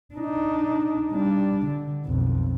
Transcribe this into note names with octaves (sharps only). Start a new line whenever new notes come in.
D4 D#4
G3 D4
D3
B1 F2